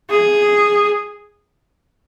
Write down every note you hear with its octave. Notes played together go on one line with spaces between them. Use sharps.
G#4